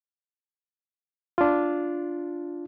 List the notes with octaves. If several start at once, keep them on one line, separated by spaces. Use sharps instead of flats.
D4 F4